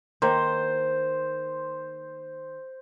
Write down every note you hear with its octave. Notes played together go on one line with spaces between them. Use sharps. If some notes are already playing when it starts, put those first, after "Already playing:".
D#3 A#3 C5